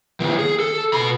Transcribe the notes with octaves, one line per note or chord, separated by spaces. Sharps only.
D#3 B3
G#4
A4
B2 B5